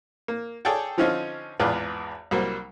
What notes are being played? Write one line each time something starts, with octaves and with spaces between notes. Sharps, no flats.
A#3
G#4 A4 C#5 D5 G5 A5
D3 F3 C4 C#4 D#4 F4
G#1 E2 F4 G#4 B4 D5
C2 F#3 G3 A#3 C5